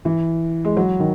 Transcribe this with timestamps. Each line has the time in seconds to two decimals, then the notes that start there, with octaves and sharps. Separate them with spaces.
0.05 E3
0.65 G#3
0.77 F#3
1.00 D#3